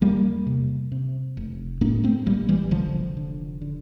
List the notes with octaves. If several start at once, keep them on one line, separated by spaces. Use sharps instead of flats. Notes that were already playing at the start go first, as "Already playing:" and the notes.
E2 G3 A#3
C3
C3
F1
A2 A#3 D4
A3 C4
A#1 G3 A#3
E3 G3
F1 D3 F3
D3
D3